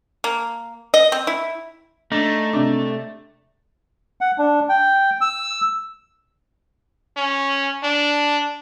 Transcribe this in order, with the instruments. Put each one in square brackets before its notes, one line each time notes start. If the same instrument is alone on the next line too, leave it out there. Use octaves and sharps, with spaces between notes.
[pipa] A#3
D#5
C4
E4
[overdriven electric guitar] A3 [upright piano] D4 [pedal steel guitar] D#4
[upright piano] C3 D4
[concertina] F#5
D4
G5
E6
[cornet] C#4
D4